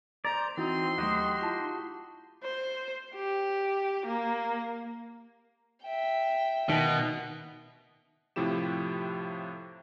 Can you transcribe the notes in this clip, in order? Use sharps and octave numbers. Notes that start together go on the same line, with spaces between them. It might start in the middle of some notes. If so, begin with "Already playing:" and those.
C5 D5 A#5
E3 C4 D#4 E4 F#4 C6
D#2 F#3 A3 F#4 G4 D#5
E4 F4 A5
C5
G4
A#3
E5 G5
B2 D#3
A2 C3 F3 E4 G4 E7